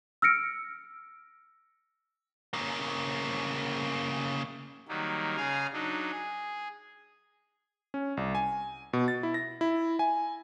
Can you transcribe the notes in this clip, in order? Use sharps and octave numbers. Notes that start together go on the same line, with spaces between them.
E6 F6 A#6 C#7 D7
C#3 A#3
D#3 F#3 G3 A#3
C#3 G#4 F5 G#5 A#5
F#3 D4 D#4
G#4
C#4
C2
G#5
B2
A6
E4
A#6
E4
G#5